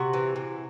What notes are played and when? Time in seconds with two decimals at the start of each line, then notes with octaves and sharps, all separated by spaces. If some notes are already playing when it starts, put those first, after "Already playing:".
Already playing: C3 F#4
0.13 E3
0.36 C3